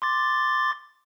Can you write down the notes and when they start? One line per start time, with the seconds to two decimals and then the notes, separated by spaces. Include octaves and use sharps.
0.02 C6 D6 A6